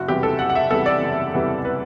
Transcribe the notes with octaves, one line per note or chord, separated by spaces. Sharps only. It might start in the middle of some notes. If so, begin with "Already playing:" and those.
Already playing: F#1 F#4
E2 C3 E3 G3 G4
A4
F#1 F#5
F#5
E5
E2 C3 E3 G3 A4
D5
F#1
E2 C3 E3 G3
B4